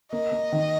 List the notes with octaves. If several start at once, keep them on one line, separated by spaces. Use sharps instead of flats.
A#3 D#5
A#3
D#3